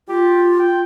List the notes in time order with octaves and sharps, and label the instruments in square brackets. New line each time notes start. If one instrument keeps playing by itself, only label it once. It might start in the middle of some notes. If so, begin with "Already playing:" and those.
[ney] F4 [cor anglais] G4
[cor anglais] G5